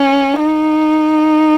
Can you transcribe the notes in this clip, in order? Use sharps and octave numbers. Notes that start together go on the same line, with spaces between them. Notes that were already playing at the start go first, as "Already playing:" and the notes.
Already playing: C#4
D#4